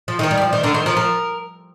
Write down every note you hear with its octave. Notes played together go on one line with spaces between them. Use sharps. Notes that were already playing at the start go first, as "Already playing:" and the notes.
F3
D#3 A#4
G3
F3 D5
D#3 C5
D3 A#4
D#3 C5
F3 A#4
F3 A#4